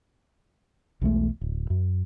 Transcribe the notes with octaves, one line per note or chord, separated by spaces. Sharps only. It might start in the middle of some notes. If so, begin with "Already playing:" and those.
B1 E2 G#3 A3
D1
F#2